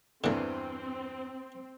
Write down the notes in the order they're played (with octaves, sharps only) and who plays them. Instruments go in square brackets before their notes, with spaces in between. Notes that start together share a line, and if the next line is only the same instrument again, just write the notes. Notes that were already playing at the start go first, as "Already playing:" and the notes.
[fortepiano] E2 G2 E3 [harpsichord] D3 A#3 [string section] C4